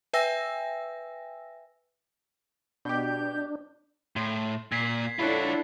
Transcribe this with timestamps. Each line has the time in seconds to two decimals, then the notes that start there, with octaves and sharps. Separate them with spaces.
0.13 B4 E5 G5 G#5 E6 A#6
2.85 B2 D4 G4 G6
4.16 A2 C6
4.72 A#2 G#6 B6 C7
5.19 D4 E4 F4 A4 C#5 F#5